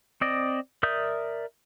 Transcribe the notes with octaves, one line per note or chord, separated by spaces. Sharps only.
C4 D5 D#5
A#4 D5 E5 D#6 G6